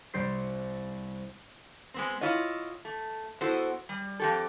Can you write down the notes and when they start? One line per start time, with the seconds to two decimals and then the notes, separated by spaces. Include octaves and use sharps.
0.14 C2 G3 G4 C5 B6 C7
1.94 G#3 B3 C4
2.21 E4 F4 C#5 D#5
2.85 A3
3.41 B3 E4 F#4 A4 C5
3.89 G3
4.20 F2 G4 A4